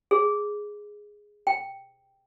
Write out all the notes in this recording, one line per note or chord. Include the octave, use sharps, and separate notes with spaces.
G#4
G5